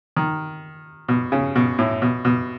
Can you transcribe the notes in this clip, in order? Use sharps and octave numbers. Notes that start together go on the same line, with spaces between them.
D#3
B2
C#3
B2
A2
B2
B2